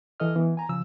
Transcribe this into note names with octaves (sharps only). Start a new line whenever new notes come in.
E3 A4 D#5 F6
E3 B3
G#5 A#5
C#3 F3 E6